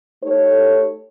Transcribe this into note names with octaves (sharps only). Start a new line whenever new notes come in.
A3 D#4 G4 A4 C#5